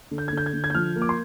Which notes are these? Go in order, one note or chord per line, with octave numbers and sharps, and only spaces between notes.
D3
G6
G#6
D3 G6
G#6
D3
G#6
G6
F3 F6
A#3
D6
C6